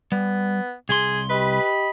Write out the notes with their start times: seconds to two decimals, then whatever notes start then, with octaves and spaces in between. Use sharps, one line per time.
0.12 G3 B3
0.89 C2 G#4 C6
1.30 G4 B4 D#5 B5